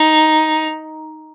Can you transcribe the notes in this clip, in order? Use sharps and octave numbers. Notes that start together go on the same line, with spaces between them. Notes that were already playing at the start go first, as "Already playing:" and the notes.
Already playing: D#4